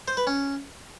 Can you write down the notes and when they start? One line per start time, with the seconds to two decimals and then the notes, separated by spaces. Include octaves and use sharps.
0.08 C5
0.17 B4
0.27 C#4